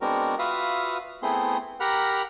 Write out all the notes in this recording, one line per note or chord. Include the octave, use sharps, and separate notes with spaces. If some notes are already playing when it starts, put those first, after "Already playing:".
G#3 B3 C4 D4 F#4 A#4
F4 F#4 B4 E5 F5 D#6
A3 B3 C4 E4 G#4 C6
G4 A#4 F#5 A#5 B5 F6